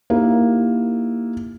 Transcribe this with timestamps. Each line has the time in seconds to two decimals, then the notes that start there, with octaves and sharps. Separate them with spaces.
0.10 A#3 D#4 E4 G4